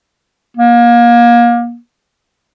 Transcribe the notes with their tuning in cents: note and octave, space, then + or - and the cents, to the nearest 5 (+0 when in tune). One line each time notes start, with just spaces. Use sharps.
A#3 +30